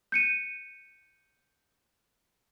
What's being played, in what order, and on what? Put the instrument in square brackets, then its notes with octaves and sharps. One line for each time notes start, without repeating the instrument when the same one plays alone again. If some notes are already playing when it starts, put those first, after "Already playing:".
[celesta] G6 C#7 D#7